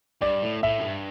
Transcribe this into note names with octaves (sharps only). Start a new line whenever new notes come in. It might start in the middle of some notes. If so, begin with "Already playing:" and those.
G2 D5
A2
A2 E5
F#2
G2